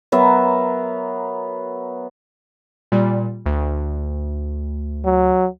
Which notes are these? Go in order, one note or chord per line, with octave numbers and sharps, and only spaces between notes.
F#3 B3 A#4 E5
A#2 G3
D2
F#3